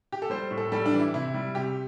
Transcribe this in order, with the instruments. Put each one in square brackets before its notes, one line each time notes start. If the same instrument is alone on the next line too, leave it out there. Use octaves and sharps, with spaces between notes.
[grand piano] G4
A4
G3 C5
A2
A4
G3 A4
D4
E3
E4
C3 E4
G3
C3 G4